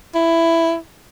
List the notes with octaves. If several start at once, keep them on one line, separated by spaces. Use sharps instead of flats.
E4